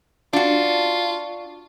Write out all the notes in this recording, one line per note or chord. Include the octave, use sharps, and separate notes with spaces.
D4 F4 F#4